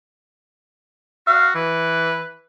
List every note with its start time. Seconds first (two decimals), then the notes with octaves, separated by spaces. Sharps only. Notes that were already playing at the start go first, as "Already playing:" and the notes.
1.27 F#4 F5
1.55 E3 B4